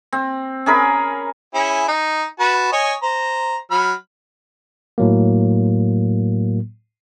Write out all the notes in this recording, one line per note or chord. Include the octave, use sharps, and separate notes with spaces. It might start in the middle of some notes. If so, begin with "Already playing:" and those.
C4
C#4 G#4 A#4 B5
C#4 E4 G#4
D#4
F#4 B4 A5
C#5 D#5 G#5
C5 A#5
F#3 B5 F6
A2 F#3 A#3